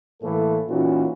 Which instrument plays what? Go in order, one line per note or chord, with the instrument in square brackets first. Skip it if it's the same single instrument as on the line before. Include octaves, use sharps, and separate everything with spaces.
[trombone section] A2 E3 A3 A#3 A4
A#2 E3 C#4 D#4 F4 F#4